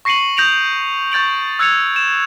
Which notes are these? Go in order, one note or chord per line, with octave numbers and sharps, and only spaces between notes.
C#6 A#6 C7 C#7 D#7 F#7
D#6 G6 A#6 D7 F7 F#7
C#6 G6 A6 D7 F#7
E6 F#6 G#6 A6 C#7 F7
E7